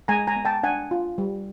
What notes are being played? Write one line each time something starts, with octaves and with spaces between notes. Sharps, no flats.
G#3 G#5 A#5
G#5 A#5
B3
G5 A5
D4 F#5 G#5
F4
G3